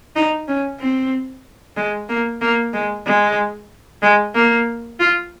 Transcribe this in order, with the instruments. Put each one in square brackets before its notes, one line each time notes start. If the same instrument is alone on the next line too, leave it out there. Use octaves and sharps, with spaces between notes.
[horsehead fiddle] D#4
C#4
C4
G#3
A#3
A#3
G#3
G#3
G#3
A#3
F4